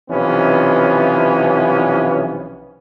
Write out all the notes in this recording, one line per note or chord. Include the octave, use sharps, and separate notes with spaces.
B1 C3 E3 F3 B3 C#4